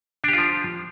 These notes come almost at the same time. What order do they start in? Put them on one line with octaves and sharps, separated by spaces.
D4 G4 F4 F3